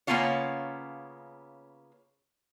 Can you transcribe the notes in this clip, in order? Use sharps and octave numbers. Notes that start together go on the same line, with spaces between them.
C#3 A#3 B3 C#4 F4 C#5